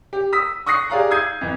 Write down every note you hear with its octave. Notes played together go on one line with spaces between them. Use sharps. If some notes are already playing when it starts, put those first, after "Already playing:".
G4
D#6 E6 B6
C#6 D#6 F#6 A#6 C7
G4 G#4 D5 F5 A#5 F#6
D#6 E6 G6 G#6 C7 D#7
F2 E3